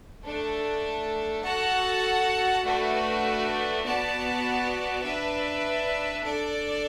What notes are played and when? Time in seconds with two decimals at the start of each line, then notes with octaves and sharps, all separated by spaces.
0.25 A3 D4 A4
1.44 F#4 A4 F#5 A5
2.64 A3 D4 F#4 B4
3.84 B3 F#4 D5 A5
5.03 D4 B4 E5
6.23 D4 A4 D5